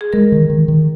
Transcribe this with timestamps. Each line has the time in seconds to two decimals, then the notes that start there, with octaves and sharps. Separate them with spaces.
0.01 G#4
0.13 G#3 A#4
0.32 D#3
0.50 D#3
0.68 D#3